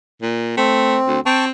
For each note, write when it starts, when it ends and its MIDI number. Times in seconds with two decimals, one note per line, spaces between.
0.22 0.55 46
0.57 0.98 57
0.57 1.20 60
1.07 1.19 38
1.26 1.51 60
1.26 1.45 79
1.26 1.45 81
1.26 1.45 85